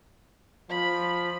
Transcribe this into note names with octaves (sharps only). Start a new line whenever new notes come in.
F3 B5